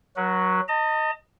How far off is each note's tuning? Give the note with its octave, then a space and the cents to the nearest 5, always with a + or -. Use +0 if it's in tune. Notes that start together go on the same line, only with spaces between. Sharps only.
F#3 +0 F#4 +0 B4 -45
D#5 +0 A5 +45